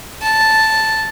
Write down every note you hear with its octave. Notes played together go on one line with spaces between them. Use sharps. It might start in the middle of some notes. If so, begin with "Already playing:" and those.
A5